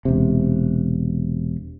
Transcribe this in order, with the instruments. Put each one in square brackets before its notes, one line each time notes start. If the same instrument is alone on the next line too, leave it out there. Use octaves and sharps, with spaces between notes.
[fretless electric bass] E1 C3